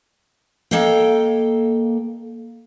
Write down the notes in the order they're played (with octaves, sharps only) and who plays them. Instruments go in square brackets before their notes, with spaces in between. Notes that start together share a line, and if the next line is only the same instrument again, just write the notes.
[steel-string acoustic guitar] A#3 A4 D#5 F5 G5